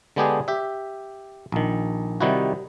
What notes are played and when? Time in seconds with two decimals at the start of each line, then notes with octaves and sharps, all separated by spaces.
0.16 D3 G#3 B3 D4 G4 G#4
0.48 G4 E5
1.52 A#1 D#3
2.21 C3 D#3 G3 D#4 E4 F#4